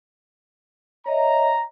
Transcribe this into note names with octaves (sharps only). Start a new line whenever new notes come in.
C#5 D#5 E5 A#5